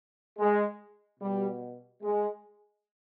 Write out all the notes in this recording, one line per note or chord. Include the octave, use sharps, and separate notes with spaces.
G#3
B2 G3
G#3